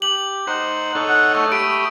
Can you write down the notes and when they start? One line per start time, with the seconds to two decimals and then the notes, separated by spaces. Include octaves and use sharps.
0.02 G4 F#7
0.47 D#4 C5 F#5
0.95 D#4 A4 C#5
1.09 F#5
1.35 A3 C#6
1.52 G4 B5 D#6 D7